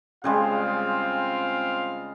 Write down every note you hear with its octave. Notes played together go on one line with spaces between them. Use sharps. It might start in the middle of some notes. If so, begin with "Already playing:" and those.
C#3 G3 G#3 C4 F4 F5